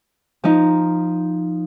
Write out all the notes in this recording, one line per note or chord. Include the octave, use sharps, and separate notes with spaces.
F3 D#4